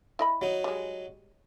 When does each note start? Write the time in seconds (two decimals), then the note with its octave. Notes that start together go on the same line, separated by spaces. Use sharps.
0.19 E4 D#5 B5
0.41 F#3 D#4
0.64 G3 G#3